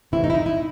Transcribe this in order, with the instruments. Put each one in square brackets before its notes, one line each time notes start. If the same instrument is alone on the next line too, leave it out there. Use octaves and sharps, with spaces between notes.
[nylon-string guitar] C3 E3 A3 C4 E4
D#4
E4
D#4
E4